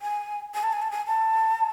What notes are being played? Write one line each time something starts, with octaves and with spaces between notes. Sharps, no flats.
G#5
G#5
A5
G#5
A5
G#5
A5